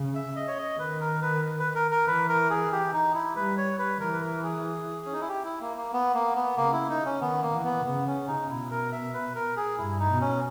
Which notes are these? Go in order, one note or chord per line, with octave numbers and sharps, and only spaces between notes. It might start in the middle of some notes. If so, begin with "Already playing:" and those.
Already playing: C#3
E5
D#5
C#5
D#5
D#3 B4
A#4
B4
B4
A#4
A#4
E3 B4
A#4
G#4
G4
D#4
E4
G3 B4
C#5
B4
E3 A#4
B4
A#4
G#4
C#4
D#4
E4
G4
E4
A#3
A#3
B3
A#3
B3
C#3 A#3
E4
D#4
C#4
D#3 B3
A#3
E3
B3
C#3 B3
C#4
D#4
B2 E4
A#4
E5
B4
A#4
G#4
G2 E4
D#4
B2
C#4